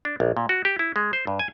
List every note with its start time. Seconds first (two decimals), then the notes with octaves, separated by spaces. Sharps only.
0.05 D4
0.20 A#1
0.37 A#2
0.49 F#4
0.65 G4
0.79 E4
0.96 G#3
1.13 C5
1.27 G2
1.39 G#5